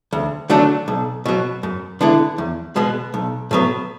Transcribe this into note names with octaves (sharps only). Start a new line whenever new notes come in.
D2
D3 F#3 A3 D4
B1
B2 F#3
F#2
D3 G#3 B3 E4
E2
B2 G#3 B3
B1
A2 F#3 B3